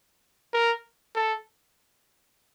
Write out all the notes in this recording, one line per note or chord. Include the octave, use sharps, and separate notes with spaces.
A#4
A4